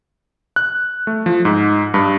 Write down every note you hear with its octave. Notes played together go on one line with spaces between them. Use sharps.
F#6
A3
F3
G#2
G2